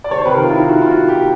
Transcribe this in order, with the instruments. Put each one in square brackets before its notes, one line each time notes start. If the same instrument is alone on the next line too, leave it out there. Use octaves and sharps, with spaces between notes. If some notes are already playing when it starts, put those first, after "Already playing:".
[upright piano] D5
C#5
C5
C3 D#3 B4
A#4
F4
E4
D#4
F#4
E4
F4
F#4
G4